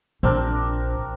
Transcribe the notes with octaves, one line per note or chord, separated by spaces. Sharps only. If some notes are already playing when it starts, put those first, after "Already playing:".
A#1 C4 D4 A#4